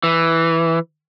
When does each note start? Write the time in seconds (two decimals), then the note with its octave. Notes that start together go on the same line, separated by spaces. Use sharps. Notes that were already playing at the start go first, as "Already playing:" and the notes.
0.04 E3